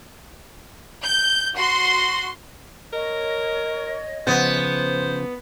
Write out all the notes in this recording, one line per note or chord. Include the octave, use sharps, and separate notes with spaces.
G6
F#4 C6
A#4 C#5 D#5
C#3 F3 B3 C5